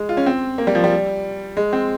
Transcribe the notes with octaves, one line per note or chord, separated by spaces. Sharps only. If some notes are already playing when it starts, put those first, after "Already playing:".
Already playing: G#3
F4
C#4
C4
A#3
G3
F3
G3
G#3
C4